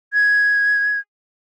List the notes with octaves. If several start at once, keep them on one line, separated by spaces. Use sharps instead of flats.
G#6